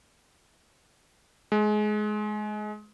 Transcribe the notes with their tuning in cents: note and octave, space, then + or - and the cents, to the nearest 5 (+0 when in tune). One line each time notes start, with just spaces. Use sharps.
G#3 +25